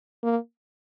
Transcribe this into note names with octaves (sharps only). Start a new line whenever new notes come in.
A#3